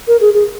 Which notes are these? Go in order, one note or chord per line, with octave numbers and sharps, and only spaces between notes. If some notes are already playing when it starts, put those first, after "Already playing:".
A#4
G#4
G#4